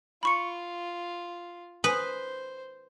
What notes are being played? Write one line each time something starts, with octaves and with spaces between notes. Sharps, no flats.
F4 B5 C#6 C#7
B4 C5 D#6